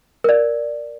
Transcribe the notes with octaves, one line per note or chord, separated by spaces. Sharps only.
A#4 D5